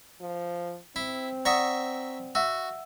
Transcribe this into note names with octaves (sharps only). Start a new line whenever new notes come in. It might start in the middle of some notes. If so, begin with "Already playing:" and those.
F3
C4 E4
D5 E5 F#5 A#5 C#6 D#6
F#4 E5 F#5 E6